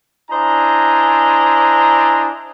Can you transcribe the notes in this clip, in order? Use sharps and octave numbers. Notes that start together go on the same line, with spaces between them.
D4 E4 C5 D#5 G#5 A#5